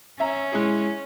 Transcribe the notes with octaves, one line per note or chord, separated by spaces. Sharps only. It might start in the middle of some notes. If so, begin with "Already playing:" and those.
C#4 E5 A#5
G#3 E4 G#4